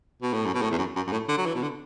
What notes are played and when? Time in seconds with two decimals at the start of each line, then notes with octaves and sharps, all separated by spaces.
0.22 B2
0.33 A2
0.46 F#2
0.54 B2
0.62 A2
0.71 E2
0.78 F#2
0.96 F#2
1.07 F#2
1.12 A2
1.29 D3
1.38 F#3
1.46 E3
1.55 B2
1.62 D3